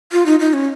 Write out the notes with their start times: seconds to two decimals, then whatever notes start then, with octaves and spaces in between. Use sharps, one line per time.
0.12 F4
0.26 D#4
0.40 D#4
0.53 C#4